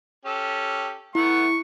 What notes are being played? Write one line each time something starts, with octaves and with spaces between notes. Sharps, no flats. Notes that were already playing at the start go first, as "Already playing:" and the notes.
C#4 G4 A4
A3 B3 E4 F#5 C#6